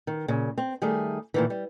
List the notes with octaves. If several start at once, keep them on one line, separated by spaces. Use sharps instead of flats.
D#3
A#2 C#3
C4
D#3 G3 A3 G#4
A#2 D#3 E3
G3